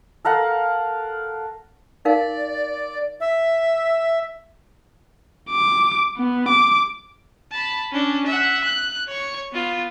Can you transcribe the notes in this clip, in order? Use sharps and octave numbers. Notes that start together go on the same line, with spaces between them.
A4 A#4 F5 F#5
D#4 A#4 D5 F5
E5
D6
B3
D6
A5 B5
C#4 D4
E5 F#5
F#6
C#5 C#6
B3 F4